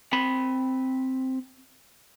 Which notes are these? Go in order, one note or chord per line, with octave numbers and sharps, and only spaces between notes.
C4 B5